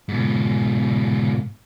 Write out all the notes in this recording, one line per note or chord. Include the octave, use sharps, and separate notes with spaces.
G#2 B2